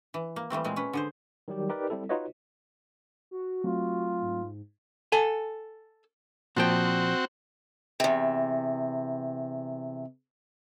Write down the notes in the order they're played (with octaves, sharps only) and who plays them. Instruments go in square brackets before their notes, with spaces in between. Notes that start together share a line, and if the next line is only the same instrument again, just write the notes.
[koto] E3
A#3
E3 G3 A3 C4
A#2 G#3 C4
C#4 B4
D3 G#4 C5
[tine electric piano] D#3 F#3 G3 G4
D#4 G4 A#4 B4 D5
G3 C4 E4 A4
D#4 F4 F#4 B4 C#5 D#5
[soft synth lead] F#4
[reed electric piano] F#3 A3 C4 [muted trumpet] F4
[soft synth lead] G#2
[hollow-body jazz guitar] A4 F#5 G#5
[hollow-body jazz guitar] A#2 F3 G5 [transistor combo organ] C4 F#4
[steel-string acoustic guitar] E2 C3